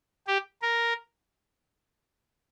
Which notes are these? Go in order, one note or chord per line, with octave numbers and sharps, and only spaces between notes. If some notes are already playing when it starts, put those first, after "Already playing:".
G4
A#4